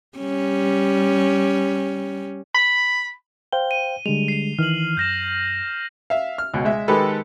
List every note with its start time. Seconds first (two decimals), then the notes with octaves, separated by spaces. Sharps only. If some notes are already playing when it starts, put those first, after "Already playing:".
0.18 G3 C#4
2.55 B5
3.53 C5 F5 G5 G7
3.71 D#7
4.06 D3 G3 G#3 F7
4.28 C7 F7
4.59 D#3 E3 F6 F#7
4.97 F#2 G6 A#6 E7
6.10 E5 F5
6.38 F6
6.54 C#2 B2
6.65 G#3 E5
6.88 D#3 G#3 G4 A4 B4